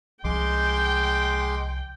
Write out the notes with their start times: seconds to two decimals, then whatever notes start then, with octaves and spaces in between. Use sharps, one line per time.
0.24 C2 F3 G#3 G5 C6 D6